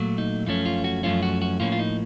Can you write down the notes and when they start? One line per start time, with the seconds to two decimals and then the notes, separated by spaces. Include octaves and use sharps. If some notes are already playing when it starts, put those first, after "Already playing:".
Already playing: A#2 F#3 A3
0.18 D#4
0.46 F#2 F3 A3 C#4 D#4
0.66 F4
0.84 F#4
1.03 F#2 F3 A3 C#4 F4
1.23 F#4
1.42 F#4
1.60 A2 F3 A#3 C#4 F4
1.72 F4
1.79 D#4